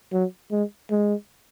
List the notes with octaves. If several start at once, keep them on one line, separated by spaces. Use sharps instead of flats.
F#3
G#3
G#3